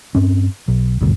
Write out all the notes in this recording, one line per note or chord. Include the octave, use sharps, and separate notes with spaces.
G2 C4 C#4
B1
G#1 D2 G2 B2